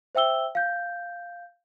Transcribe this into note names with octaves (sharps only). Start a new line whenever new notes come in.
C5 E5 G5 E6 G7
F5 G6